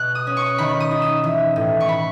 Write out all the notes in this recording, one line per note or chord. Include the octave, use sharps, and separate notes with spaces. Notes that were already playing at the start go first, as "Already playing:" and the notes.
Already playing: B2 F#6
D#6
C#4
C#6
D#3 B5
D#6
D#4
E6
E3
A2
C#6
B5